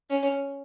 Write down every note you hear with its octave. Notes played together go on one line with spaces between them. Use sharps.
C#4